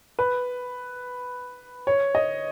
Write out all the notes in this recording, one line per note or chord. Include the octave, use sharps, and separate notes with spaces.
B4
C#5
D#5